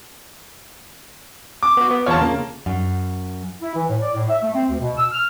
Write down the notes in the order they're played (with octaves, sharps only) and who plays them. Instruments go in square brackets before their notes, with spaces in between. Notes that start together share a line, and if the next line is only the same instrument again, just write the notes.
[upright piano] D6
[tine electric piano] B3 F#4
B3
[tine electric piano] E2 F4 F6 [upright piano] C#5 A5
[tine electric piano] C#3 [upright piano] A#3
[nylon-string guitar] F#2
[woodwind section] E4
E3
A2
D5
A2
E5
A3
C4
D2
B2
E6
F6